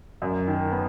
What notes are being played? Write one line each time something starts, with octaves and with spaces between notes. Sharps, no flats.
F#2
D#3
B3